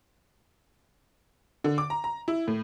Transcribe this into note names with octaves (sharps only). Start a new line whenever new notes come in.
D3
D6
A#5
A#5
E4
A2